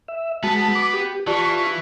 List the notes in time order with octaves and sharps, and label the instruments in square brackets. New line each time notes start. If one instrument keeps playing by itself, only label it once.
[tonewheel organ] E5
[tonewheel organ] G#3 A5 [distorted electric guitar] B3 [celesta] F#4
[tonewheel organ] D6
G4
[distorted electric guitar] E3 [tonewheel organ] F4 C#6 [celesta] G4 D5 A5